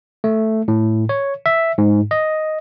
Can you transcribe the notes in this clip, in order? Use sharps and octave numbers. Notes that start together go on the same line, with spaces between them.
A3
A2
C#5
E5
G#2
D#5